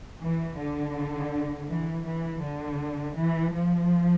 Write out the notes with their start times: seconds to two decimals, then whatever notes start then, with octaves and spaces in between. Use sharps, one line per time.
0.22 E3
0.59 D3
1.69 E3
2.06 E3
2.42 D3
3.16 E3
3.53 F3